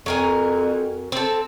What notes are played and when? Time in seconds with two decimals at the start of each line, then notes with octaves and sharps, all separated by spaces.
0.06 F2 F#3 A#4 G#5
1.12 C4 A4